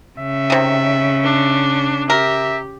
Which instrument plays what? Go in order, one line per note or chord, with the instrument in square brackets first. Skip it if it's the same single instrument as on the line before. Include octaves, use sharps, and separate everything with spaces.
[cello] C#3 [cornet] E5
[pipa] C3 D#3
[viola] D4
[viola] G4 [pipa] A#4 [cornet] E5